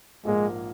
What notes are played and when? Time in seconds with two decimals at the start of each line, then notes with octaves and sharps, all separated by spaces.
0.25 A#1 G#2 F3 G#3 A#3